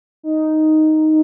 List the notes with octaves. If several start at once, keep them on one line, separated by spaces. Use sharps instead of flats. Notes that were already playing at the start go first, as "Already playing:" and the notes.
D#4